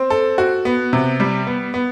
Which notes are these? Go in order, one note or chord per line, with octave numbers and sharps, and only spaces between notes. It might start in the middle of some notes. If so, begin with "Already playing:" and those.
Already playing: C4
A4
F#4
B3
C3
G3
B3
B3